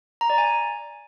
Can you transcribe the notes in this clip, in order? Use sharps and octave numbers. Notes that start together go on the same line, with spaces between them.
A#5
D5
G#5